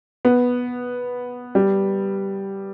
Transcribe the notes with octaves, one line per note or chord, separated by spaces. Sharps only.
B3
G3